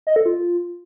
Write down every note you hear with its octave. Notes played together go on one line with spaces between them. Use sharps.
D#5
A4
F4